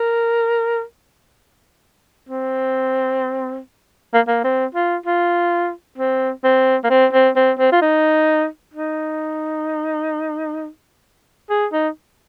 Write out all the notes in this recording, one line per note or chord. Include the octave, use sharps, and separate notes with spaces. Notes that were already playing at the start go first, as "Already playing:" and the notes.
Already playing: A#4
C4
A#3
A#3
C4
F4
F4
C4
C4
A#3
C4
C4
C4
C4
F4
D#4
D#4
G#4
D#4